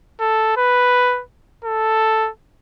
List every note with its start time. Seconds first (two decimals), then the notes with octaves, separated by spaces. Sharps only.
0.21 A4
0.57 B4
1.65 A4